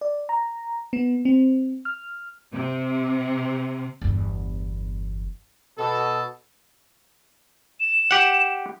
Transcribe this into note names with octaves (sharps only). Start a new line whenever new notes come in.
D5
A#5
B3
C4
F6
C3
G1 E2
B2 A4
E7
G4 F#5